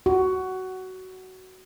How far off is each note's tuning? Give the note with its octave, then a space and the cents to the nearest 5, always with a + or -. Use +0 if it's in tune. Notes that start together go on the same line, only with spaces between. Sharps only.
F#4 +15